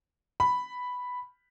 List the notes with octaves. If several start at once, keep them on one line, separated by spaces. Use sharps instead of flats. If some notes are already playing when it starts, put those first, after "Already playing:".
B5